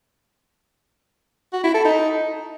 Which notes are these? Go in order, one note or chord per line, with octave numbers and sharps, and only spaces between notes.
F#4
E4
A4
D#4